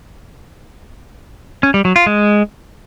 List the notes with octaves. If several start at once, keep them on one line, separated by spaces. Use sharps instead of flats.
C#4
G3
F#3
F4
G#3